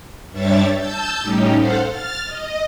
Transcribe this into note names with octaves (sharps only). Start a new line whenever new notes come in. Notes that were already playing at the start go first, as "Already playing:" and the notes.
G2 G3 D4 C#5 E5 A6
A5 E6 G6
A2 G3 C#4 D#4 G4
A4 C5 F5 F#5
F6 A6
D#5